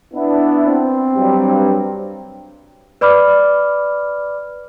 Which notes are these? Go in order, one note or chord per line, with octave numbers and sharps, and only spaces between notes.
B3 D4 E4
C4
G2 F#3 G3
B4 D5 B5 D6 F6